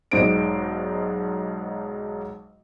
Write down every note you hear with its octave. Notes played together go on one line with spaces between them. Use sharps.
B1 G#2 D#4 C5 D5 D7